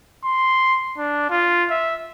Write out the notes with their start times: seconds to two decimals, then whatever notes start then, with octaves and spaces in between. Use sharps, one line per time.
0.24 C6
0.98 D4
1.30 F4
1.70 E5